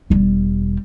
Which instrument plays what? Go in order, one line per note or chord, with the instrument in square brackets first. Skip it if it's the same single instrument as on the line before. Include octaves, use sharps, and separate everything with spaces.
[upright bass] E1 G3